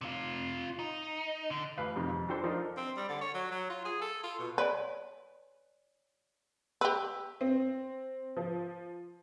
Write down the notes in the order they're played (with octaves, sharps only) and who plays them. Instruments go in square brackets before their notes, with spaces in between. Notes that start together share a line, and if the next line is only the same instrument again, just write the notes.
[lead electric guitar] C3 F4
D#4
D3
[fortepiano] A1 B4 F5
F2 C3 D#3
F2
D4 F#4 G4 A4 C5
F3 D4 D#4 A#4
[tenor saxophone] C4
G3
D3
C#5
F#3
F#3
F4
G#4
A4
F4
B2
[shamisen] B4 [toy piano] C#5 D5 G#5
[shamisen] G4 B4 [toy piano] E6
[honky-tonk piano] C4
F3